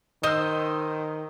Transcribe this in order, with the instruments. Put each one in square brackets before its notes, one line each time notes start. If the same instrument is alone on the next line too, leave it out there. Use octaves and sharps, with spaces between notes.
[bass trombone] D#3 [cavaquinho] C5 D#5 C6 [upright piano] D#6 E6